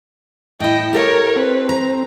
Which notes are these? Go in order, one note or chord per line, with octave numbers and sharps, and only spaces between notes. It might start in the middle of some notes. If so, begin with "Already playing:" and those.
A2 E4 D#5 G5
G4 A4 A#4 C#5 D#5
C4 B4
A#5